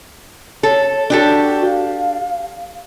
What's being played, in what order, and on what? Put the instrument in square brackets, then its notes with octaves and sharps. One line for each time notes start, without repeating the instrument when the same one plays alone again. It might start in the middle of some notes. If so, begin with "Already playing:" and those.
[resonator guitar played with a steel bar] A4 [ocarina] C#5
[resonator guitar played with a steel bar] D4 G4 A4 [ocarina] F#4
[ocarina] F5